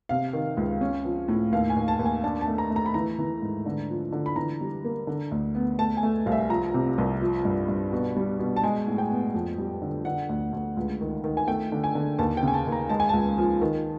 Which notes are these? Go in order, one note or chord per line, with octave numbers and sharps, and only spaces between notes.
C3 F5
D#3
C#2
C#4
F3
A2
D#2 F5
G#5
D#2
A5
D#2
G#5
D4 A5
A5
A3
A#5
A3
A#5
B5
E3 A#5
E3
G#2
D3
F3
D3
B5
E3 A#5
G3
A#3
D3
D2
B3
A3 A5
G#5
A3
C2 F5
E5
F3 A#5
C3
C2
F3
G2
G2
B2
G3
B2
A5
G#3 G#5
A2
G5
B3
F2
G3
D3
D3 F#5
D2
D2
C#2
D#3
D#3
G#5
A3 G5
D3
G#5
D3
D#2 A5
G5
C#3 G#5
A5
D#2
A#5
G#3 A5
G#5
C#2 A5
F3
D#3